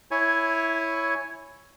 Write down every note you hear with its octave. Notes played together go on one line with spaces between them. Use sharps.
E4 C#5 G#5